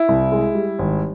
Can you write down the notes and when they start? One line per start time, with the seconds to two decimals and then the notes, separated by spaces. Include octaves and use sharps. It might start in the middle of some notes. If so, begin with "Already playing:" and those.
Already playing: E4
0.09 C2
0.32 G#3
0.55 G3
0.79 G#1